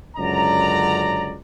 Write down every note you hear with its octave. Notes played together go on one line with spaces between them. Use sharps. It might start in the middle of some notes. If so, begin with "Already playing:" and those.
C#2 F#2 D3 D5 A#5